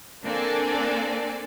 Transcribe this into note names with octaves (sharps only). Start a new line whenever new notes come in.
A#3 C4 D4 A4 D5 G#5